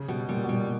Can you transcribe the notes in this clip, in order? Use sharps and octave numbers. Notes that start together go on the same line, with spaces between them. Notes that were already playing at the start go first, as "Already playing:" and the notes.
Already playing: C#3
B2 G3
A#2 G3
B2
A#2 G3